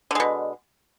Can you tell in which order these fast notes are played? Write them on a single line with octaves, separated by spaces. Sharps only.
D3 G#3 B2